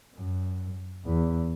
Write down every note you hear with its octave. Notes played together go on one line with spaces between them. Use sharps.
F#2
E2